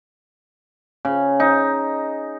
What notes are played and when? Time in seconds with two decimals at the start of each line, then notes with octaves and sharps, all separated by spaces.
1.05 C#3
1.40 D#4